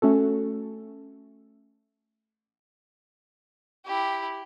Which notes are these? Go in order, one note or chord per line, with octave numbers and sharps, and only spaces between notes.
A3 C#4 F#4 A4
E4 G4